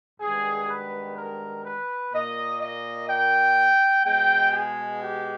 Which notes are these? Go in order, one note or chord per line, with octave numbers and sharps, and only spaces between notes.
G2 D#3 G#3 B3 G#4
B4
A#4
B4
A#2 A#3 D#5
D#5
G5
B2 G#3 B3 G5
G#4
G4